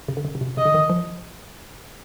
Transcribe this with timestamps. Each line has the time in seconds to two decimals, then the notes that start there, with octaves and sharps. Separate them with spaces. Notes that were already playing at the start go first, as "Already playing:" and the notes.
0.08 C#3
0.17 D3
0.25 C#3
0.35 C#3
0.41 C3
0.57 C#3 D#5
0.65 D3
0.74 D#3
0.90 F3